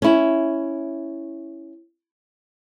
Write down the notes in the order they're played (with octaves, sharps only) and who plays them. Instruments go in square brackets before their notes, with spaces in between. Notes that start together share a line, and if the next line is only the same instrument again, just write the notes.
[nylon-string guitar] C#4 E4